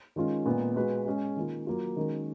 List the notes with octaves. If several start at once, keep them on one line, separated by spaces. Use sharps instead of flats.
D#3 G#3 C#4 F4
A#2 G#3 B3 F4
G#3 B3 F#4 B4
G#3 C#4 G#4
D#3 A#3 F4
F#3 A#3 F4
D#3 G#3 C#4 F#4 A#4